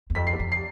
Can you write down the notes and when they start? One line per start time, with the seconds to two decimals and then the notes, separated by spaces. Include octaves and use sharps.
0.10 E2
0.15 F2 B6
0.27 C7
0.33 E2
0.39 F2
0.52 C7